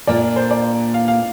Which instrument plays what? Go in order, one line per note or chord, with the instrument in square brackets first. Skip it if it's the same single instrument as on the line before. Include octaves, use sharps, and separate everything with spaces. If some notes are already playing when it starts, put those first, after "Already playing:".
[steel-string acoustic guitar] A#2 A#3 D4 F4 [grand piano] D5
[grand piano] C5
D5
F5
F5